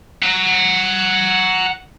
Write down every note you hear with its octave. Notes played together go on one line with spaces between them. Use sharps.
F#5 A#5